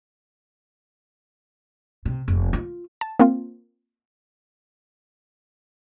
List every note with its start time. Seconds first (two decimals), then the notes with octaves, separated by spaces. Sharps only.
2.05 C3
2.28 F1
2.53 F4
3.01 A5
3.19 A#3 C4 F4